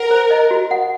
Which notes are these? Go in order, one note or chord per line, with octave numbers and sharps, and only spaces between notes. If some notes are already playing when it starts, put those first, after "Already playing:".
Already playing: A#4 F#5
C5
D#5
F#4
F#5